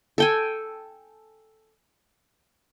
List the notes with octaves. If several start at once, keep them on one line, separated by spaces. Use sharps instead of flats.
A4 G5 G#5